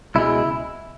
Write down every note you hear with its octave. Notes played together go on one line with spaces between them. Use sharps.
C#2 B2 G#3 E4